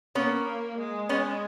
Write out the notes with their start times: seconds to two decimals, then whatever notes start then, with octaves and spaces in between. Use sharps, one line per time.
0.15 A#3 B3 C#4
0.79 G#3
1.09 G#3 B3 C#4